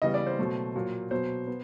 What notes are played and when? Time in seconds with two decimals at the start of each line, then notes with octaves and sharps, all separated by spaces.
0.02 C#3 E3 G3 B3 D#5
0.14 D5
0.27 C5
0.39 B2 F#3 A3
0.75 A#2 F#3 A#3
1.11 B2 F#3 B3 C5
1.47 B3